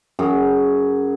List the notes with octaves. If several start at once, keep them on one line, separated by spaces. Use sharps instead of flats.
F#2 G#4